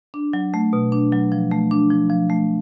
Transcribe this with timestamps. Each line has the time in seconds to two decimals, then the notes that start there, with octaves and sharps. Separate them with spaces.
0.14 D4
0.33 F#3
0.54 A3
0.73 B2
0.92 D4
1.12 F#3
1.32 F3
1.51 A3
1.71 D4
1.90 F3
2.10 F3
2.30 A3